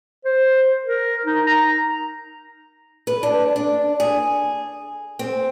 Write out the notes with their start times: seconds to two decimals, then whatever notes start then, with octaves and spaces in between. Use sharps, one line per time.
0.25 C5
0.85 A#4
1.26 D#4
1.47 A#5
3.07 B4
3.23 D4
3.56 D4
4.00 G#4
5.19 C4